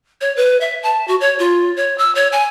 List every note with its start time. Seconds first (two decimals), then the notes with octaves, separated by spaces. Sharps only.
0.21 C#5
0.36 B4
0.61 E5
0.83 A5
1.08 F#4
1.21 C#5
1.39 F4
1.76 C#5
1.98 E6
2.15 C#5
2.32 G#5